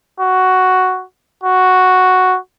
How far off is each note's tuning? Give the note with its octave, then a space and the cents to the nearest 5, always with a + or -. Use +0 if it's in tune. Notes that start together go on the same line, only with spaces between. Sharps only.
F#4 +5
F#4 +0